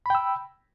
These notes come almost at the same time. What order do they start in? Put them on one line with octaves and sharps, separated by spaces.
B5 G5 E6